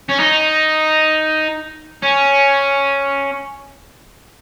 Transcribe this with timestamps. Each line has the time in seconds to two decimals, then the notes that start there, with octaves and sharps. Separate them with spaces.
0.09 C#4
0.19 D#4
2.02 C#4